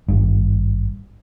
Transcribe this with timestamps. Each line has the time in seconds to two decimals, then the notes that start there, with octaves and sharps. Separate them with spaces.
0.08 G#1 G2